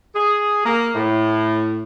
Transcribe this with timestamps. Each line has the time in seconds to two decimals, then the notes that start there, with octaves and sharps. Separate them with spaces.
0.16 G#4
0.66 A#3
0.94 A2